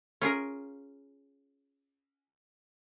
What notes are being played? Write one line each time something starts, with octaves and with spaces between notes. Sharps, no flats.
C#4 F4 G#4 A#4